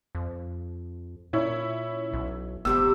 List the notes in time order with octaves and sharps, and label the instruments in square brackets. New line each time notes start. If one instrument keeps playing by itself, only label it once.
[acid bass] F2
[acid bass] A#2 [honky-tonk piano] C#4 E4 C#5
[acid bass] B1
[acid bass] F1 [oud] C3 G3 B3 [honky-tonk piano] E6